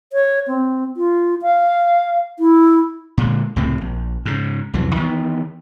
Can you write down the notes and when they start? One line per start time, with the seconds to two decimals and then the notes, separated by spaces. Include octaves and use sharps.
0.13 C#5
0.48 C4
0.97 F4
1.42 F5
2.39 E4
3.18 A#2 D3 G#3
3.56 C#2 A2 C3 C4
3.81 A#1
4.26 G#2 C#3
4.74 C2 F2 E3 F#3
4.96 D#3 E3 A#3 B3